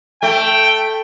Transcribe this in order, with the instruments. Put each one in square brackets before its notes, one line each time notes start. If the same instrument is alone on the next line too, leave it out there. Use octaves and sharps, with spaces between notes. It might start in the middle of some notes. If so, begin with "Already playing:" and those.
[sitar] A3 [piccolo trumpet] G5